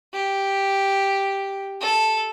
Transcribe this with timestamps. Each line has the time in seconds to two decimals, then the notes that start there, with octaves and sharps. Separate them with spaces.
0.13 G4
1.81 A4